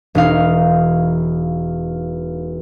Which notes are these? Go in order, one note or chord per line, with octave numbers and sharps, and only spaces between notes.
E1 D#4 F5